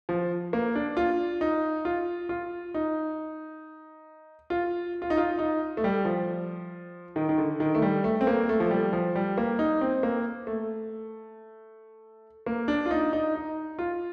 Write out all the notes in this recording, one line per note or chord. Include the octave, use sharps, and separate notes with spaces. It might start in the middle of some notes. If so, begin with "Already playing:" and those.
F3
A#3
D4
F4
D#4
F4
F4
D#4
F4
F4
D#4
F4
D#4
A3
G3
F3
D#3
D#3
D3
D#3
A3
G3
A3
C4
A#3
A3
F3
G3
F3
G3
A#3
D#4
C4
A#3
A3
A#3
D4
F4
D#4
D#4
D#4
F4